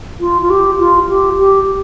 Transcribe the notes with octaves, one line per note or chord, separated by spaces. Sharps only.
F4
F4
G4
F4
G4
G4